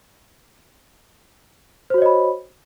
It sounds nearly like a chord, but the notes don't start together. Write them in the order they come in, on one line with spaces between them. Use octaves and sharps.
C5 F#4 C#5 D#5 B5